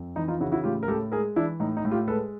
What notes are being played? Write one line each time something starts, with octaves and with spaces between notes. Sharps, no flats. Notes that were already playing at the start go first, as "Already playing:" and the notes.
Already playing: F2
E3 D#4
D#4 F4
C#3 E4 F#4
E4 F#4
A2 F4 G4
A#4
A2 G4 A4
G#3 G#4 A#4
E3 D4 E4
A2 D#4
D#4
A2
F4 G4
G#3 A4 B4